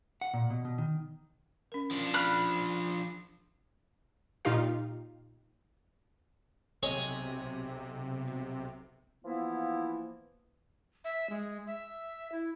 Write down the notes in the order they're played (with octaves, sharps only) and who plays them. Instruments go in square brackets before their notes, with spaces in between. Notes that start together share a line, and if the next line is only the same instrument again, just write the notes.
[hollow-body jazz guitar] F#5
A#2
B2
B2
D#3
[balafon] C#4 A#4
[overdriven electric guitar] F3 D4
[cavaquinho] B5 [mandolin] F6 F#6
[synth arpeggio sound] A#2 D#4 F4 G4 F5
[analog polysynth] B1 C3 [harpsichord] G#4 C#5 D#5
[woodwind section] E3 F3 A#3 B3 E4
[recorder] E5
G#3
E5
E4